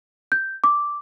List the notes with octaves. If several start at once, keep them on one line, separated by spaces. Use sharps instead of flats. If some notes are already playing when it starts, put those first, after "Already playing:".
G6
D6